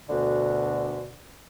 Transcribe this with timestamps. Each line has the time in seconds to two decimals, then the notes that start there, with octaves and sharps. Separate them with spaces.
0.09 D2 B2 D3